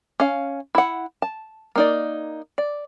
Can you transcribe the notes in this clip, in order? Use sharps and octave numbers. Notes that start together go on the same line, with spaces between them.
C#4 F5
E4 F#5
A5
A#3 D#4 D5
D5